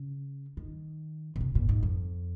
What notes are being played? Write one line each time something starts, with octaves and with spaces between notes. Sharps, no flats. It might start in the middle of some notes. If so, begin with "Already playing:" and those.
Already playing: C#3
D#3
A#2
C3
A#2
G#2
F2